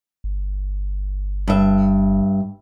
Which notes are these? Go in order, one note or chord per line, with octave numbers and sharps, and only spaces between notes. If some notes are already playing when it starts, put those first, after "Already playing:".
G1
G2 E5